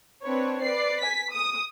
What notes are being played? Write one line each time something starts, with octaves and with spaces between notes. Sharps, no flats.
C4 D4 B4 C#5
B4 D5 C7
G#5 B6
D#6